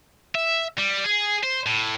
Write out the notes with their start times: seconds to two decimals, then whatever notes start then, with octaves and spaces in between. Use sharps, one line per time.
0.35 E5
0.78 G3
1.04 G#4
1.43 C5
1.66 A2